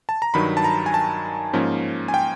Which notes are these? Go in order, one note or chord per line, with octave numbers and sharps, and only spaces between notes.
A5
A#5
G2 D#3 F#3 B5
A5
A#5
G#5
A5
G#2 F3 A#3 C#4
G#5
G5